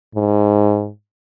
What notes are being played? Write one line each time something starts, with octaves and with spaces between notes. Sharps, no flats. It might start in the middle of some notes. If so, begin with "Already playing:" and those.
G#2